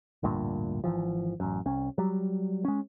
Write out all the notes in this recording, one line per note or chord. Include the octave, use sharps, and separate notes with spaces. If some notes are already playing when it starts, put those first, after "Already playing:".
A1 D2 G2 A#2
G#1 F2 E3 F3
A1 F#2
C2 C#4
F#3 G3
G#3 C#4